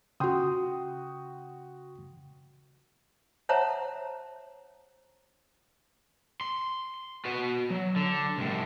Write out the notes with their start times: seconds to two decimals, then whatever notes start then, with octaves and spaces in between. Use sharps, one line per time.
0.20 C#3 F#4 G5 C6 D#6
3.49 C5 C#5 E5 F#5 A5 A#5
6.41 C6
7.25 F#4 B4
7.70 F#3
7.96 D3
8.37 C2 A2